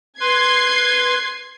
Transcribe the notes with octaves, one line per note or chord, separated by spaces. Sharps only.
B4 C6 G#6 C7